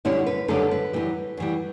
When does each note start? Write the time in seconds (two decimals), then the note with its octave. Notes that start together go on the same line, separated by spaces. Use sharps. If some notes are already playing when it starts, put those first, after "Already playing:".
0.05 F#2 D3 G3 C#4 E4
0.27 B4
0.48 F#2 D3 G3 C#4 A4
0.71 B4
0.93 F#2 E3 G3
1.37 F#2 E3 G3